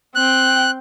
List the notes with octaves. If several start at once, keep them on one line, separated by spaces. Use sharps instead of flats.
C4 G5 F#6